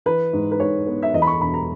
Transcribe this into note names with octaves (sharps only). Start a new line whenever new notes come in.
E3 B4
G#2
B4
G#2 C#5
B3
E5
E2 D#5
B5
C#6
E1 B5
A#5